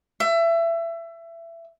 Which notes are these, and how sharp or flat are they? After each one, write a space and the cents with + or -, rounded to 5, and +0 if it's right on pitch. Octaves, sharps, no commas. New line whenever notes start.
E5 +25